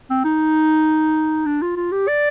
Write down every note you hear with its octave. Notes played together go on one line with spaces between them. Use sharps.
C4
D#4
D4
F4
F4
G4
D5